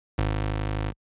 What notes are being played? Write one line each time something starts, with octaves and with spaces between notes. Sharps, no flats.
G#1